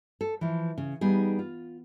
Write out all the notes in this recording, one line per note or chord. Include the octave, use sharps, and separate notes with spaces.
A4
E3 F3
C#3
G3 B3 D#4 G#4
F4